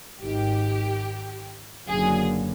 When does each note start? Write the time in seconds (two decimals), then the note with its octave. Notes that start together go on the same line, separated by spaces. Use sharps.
0.21 G#1 G#2 D#3 G4
1.88 F#1 F#2 D3 F#3 A#3 G#4